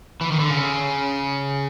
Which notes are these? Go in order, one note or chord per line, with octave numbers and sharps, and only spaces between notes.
E3
D#3
D3
C#3